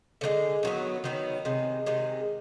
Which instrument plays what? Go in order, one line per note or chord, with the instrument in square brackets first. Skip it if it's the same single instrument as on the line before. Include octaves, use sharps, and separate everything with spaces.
[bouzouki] D3 F3 G#3
D#3 F#3 B3
D#3 F#3 B3
C3 D#3 G#3
C3 D#3 G#3